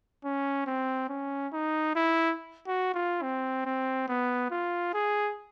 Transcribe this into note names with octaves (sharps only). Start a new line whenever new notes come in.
C#4
C4
C#4
D#4
E4
F#4
F4
C4
C4
B3
F4
G#4